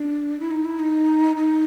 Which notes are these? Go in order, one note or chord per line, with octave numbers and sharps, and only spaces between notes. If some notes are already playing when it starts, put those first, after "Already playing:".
Already playing: D4
E4
D#4
E4
D#4
D#4